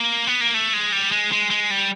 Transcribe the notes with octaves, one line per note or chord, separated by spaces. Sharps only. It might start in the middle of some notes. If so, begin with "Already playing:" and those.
Already playing: A#3
B3
A#3
A3
G#3
G3
G#3
G#3
G#3
G3